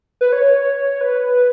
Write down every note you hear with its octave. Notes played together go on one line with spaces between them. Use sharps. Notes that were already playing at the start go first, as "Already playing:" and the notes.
B4
C#5
B4